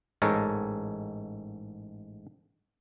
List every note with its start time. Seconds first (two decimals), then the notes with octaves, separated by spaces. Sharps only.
0.22 A1 G#2 G#3 A4 A#4 C#5